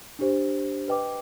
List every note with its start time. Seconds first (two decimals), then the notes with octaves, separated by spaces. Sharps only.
0.19 D4 G4 C5
0.88 B4 D#5 G5 D6